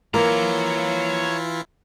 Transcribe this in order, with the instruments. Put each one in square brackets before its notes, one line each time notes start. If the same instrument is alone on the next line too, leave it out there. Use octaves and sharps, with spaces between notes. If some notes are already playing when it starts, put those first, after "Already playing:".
[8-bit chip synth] E3 E4 F4 [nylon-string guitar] A#3 [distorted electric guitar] C#5 A#5